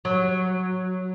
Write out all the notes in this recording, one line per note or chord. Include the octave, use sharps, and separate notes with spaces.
F#3